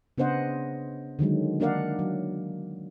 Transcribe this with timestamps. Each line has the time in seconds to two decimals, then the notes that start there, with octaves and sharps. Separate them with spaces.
0.18 C#3 B3 D4 C5 D#5 F#5
1.19 D3 D#3 F#3 G#3
1.60 A#3 D4 A#4 D5 F5 F#5
1.99 F#3